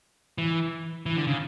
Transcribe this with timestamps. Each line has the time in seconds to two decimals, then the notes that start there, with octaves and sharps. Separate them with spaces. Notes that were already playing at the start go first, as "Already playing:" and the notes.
0.38 E3
1.06 E3
1.17 D3
1.27 C#3